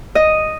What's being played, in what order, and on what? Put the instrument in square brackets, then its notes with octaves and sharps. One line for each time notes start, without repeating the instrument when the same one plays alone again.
[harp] D#5